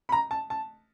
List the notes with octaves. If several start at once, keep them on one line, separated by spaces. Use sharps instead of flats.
B5
A#5
A5
A5